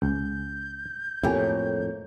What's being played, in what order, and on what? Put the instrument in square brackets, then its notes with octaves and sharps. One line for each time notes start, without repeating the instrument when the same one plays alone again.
[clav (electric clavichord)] C#2 [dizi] G6
[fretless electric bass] F2 A2 [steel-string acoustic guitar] A#3 C#5 [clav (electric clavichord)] E4 G4 G#5